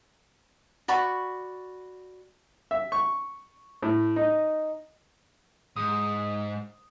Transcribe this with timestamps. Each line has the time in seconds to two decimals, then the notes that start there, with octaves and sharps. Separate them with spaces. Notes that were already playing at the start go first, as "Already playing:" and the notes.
0.88 F#4 D5 B5 C#6
2.71 E5
2.92 C#6
3.83 A2
4.16 D#4
5.76 G#2 D#6